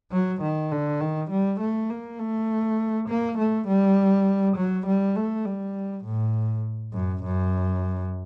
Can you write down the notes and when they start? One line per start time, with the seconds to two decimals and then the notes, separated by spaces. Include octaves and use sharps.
0.12 F#3
0.42 D#3
0.72 D3
1.01 D#3
1.31 G3
1.60 A3
1.90 A#3
2.19 A3
3.09 A#3
3.38 A3
3.67 G3
4.56 F#3
4.86 G3
5.16 A3
5.45 G3
6.05 A2
6.94 F#2
7.24 F#2